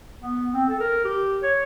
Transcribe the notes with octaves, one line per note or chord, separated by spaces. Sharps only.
B3
C4
A4
A#4
G4
C#5